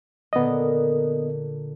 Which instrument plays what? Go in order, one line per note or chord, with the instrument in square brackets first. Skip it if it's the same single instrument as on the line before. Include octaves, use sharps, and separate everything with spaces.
[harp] A#2 D3 A#3 [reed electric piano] B3 D#5